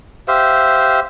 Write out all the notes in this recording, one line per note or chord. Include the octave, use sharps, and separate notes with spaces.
G4 C5 E5 F5